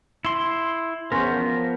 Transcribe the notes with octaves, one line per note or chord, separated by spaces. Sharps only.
E4 C6
E2 B3 C#4 A#4 C5
F3